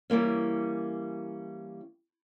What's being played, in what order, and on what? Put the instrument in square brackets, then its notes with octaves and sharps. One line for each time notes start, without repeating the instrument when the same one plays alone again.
[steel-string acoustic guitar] E3 G3 A#3 C#4